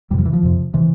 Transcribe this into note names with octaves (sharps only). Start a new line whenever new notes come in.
F2 C3 F3 G3
E3
F3
F2 C3
C3 E3